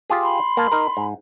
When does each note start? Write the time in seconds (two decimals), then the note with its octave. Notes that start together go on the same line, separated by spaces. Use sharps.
0.10 F4 G4 G#4
0.24 B5 C6
0.57 A#3 A5
0.72 D#4 A#4
0.97 G#2